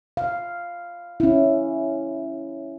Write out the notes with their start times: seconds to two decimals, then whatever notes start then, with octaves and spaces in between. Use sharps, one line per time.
0.17 F5
1.20 C#4 E4